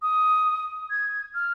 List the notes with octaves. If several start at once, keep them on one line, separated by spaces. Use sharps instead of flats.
D#6
G#6
F6